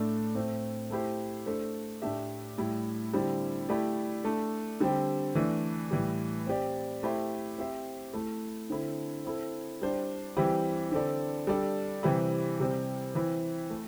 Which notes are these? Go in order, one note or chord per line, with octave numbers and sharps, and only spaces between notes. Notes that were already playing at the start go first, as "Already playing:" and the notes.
Already playing: A2 A3 D4 A4
A2 A3 C4
A3 E4 G4 C5
A3 D4 A4 C5
A2 A3 D4 G4 E5
A2 G3 E4
D3 G3 C4 E4
A3 E4 G4 D5
A3 D4 A4
D3 G3 C4 G4
E3 A3 D4
A2 E3 G3
C4 G4 D5
A3 E4 G4 C5 E5
C4 G4 C5 E5
A3 E4 A4
D3 C4 E4 A4
C4 E4 A4
G3 D4 C5
E3 G3 C4 E4 G4
D3 C4 A4 D5
G3 D4 A4 D5
C3 E3 G3 C4 E4
C3 G3 C4
E3 C4 E4
A3